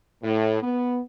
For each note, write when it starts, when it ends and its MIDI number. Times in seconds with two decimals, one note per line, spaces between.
0.23 0.59 45
0.62 1.00 59